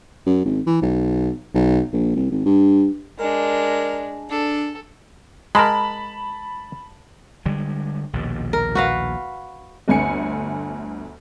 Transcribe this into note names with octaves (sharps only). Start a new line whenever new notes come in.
F#2
G#1
E3
B1
B1
A#1
C2
G#1
G2
G#3 D4 A#4
D4 A4
G#3 A#4 A5 B5
D3 G3 G#3
A#1 D#2 B2
A#4
F#4 B4 F5
G1 D2 G#5 C#7